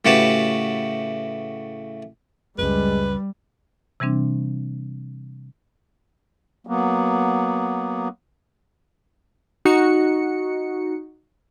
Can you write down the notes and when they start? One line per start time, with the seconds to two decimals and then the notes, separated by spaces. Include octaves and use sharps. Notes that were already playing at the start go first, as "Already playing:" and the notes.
0.05 A2 C#3 F#4 G4 B4 A5
2.58 C#2 F#2 G3 G#3 B4
4.00 C3 E3 G3 C4 D4
6.67 F#3 A#3 B3
9.65 D#4 F#4 C#7